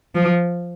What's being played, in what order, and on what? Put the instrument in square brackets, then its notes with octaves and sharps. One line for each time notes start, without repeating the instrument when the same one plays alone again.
[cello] F3